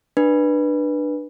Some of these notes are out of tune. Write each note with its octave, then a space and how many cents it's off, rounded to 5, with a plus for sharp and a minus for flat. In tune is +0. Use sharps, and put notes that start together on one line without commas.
D4 +20 B4 -15